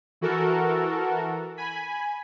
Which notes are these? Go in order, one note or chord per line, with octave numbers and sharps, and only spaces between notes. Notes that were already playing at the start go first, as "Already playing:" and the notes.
E3 F#4 A4 A#4
G#5 B5